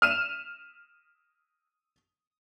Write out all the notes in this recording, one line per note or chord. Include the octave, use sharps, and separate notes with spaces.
F6 D#7 E7